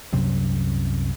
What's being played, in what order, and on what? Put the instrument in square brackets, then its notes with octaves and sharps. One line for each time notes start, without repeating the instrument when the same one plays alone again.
[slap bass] C2 F#2 C3 F#3